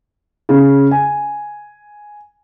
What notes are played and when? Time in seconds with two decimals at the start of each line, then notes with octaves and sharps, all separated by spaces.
0.49 C#3
0.91 G#5